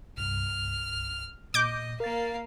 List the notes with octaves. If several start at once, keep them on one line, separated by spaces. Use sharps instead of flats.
C2 G2 F6
A#2 D#5 D6 G6
A#3 A#4 F5 A6